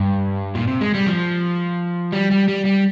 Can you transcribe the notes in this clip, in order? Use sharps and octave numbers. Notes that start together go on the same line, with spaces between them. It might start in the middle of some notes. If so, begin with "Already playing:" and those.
Already playing: G2
A#2
C3
G#3
G3
F3
G3
G3
G3
G3